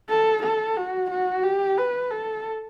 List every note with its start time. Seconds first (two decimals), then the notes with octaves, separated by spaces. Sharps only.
0.09 A4
0.43 A4
0.77 F#4
1.11 F#4
1.43 G4
1.78 B4
2.11 A4